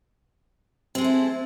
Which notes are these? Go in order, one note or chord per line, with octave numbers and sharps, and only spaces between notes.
G#3 C4 E4 A4